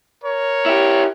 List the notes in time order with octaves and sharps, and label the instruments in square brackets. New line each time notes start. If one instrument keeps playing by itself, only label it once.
[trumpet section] A#4 C#5
[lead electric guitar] E4 G4